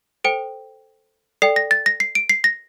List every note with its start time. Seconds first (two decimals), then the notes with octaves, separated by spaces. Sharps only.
0.24 A4 C5 G5 D7
1.42 A4 D5 G5 C7
1.56 A#6
1.71 A6
1.86 A#6
2.00 C7
2.15 D7
2.30 C7
2.44 A#6